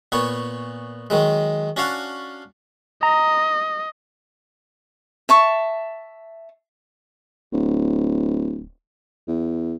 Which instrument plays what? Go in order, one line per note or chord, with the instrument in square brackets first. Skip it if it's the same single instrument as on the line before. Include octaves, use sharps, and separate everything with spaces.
[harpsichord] A#2 B3 C#5 C#6
D#3 F#3 G#3
C#4 D4 F#4 F5 F#5 A5
[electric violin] D#5 [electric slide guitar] A#5
[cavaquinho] E5 A5 C#6
[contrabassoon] D1
E2